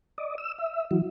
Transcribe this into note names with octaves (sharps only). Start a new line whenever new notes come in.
D5 D#5
E6
E5
E3 F#3